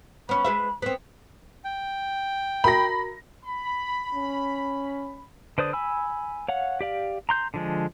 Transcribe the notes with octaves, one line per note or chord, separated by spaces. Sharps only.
B3 C#4 B5
G#3 B4 E5
B3 C4
G5
F#4 A#4 A#5 B5 A#6
B5
C#4
D3 B4 C5 D5 D#6
G#5 B5 E6
C#5 F5 F#5
G4 D5 F5
A#5 C6 G6
D3 F3 G#3